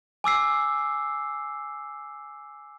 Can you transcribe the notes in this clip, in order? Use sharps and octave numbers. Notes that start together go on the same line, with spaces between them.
G#5 D6 E6 C7